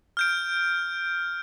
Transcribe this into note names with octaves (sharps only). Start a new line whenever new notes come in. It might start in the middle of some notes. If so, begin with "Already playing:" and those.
F6 G6 D7